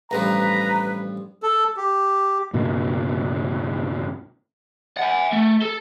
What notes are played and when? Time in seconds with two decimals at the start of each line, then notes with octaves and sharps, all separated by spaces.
0.11 A1 G2 F3 B4 A#5
1.43 A4
1.77 G4
2.53 C#2 G2 B2 A#3
4.97 F#5 G#5
5.32 A3
5.62 A4